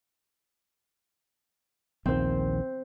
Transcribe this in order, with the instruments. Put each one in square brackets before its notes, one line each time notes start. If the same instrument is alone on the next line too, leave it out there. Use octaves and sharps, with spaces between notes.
[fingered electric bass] A#1 D#2 D#3 [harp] C4 C5